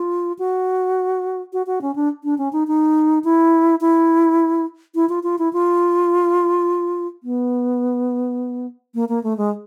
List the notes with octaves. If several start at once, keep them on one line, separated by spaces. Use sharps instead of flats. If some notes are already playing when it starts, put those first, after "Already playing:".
Already playing: F4
F#4
F#4
F#4
C#4
D4
D4
C#4
D#4
D#4
E4
E4
E4
F4
F4
E4
F4
B3
A#3
A#3
A3
G#3